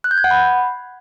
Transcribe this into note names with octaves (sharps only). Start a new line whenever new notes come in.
F#6
G6
G#6
F#5
B5